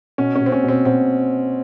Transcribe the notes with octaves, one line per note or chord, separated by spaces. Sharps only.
B2 C#4
C#4
B2
C4
C#4
B2
C4
B2 C4